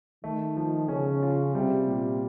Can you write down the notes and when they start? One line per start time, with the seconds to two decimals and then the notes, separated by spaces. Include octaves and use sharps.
0.24 D#3 A3
0.57 F3
0.89 C#3 C#4
1.23 F4
1.55 C3 G3
1.87 A#2